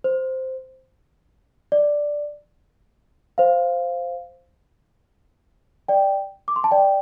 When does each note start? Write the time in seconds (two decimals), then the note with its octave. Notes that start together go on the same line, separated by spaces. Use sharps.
0.04 C5
1.72 D5
3.38 C5 F5
5.88 D5 G5
6.48 D6
6.56 C6
6.64 A5
6.71 D5 G5